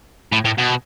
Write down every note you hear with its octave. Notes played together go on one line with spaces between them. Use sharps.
A2
A2
B2